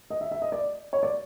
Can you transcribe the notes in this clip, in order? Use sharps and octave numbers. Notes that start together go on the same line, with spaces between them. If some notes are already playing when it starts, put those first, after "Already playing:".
D#5
E5
E5
D#5
D5
C#5
D5